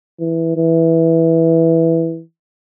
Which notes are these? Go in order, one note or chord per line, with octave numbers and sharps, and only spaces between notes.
E3
E3